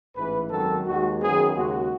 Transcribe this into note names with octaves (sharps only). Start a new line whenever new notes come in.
A1 G#2 E3 B4
G#1 F#2 D#3 F#3 A4
D#2 D#3 G#3 F#4
F#2 D#3 F#3 B3 G#4
D#2 C#3 G#3 F#4